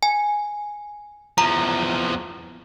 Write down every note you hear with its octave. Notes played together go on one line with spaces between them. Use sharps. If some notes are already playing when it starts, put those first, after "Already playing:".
G#5
E2 F3 A#5